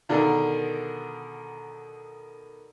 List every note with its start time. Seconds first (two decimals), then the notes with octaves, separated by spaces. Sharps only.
0.09 B2 D3 D#3 D4 G#4 A#4